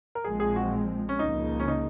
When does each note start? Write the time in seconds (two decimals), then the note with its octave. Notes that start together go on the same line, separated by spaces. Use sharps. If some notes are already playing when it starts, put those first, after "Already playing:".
0.15 A#4
0.24 A#1 A#2 F3 G#3 C4 G#4
0.40 G#4
0.56 F#4
1.09 C#4
1.19 C#2 C#3 F3 A#3 D#4
1.60 C#4
1.68 D#4